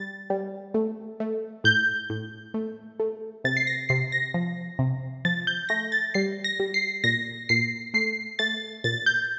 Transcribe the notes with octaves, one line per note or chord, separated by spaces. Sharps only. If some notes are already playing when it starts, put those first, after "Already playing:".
Already playing: G3 A6
G3
A3
A3
A2 G6
A2
A3
A3
C3 A6
C7
A#6
C3 C7
A#6
F3
C3
F3 A6
G6
A3 A#6
A6
G3 C7
A#6
G3
C7
A#2 A#6
A#2 C7
A3 C7
A3 A6
A#2 A6
G6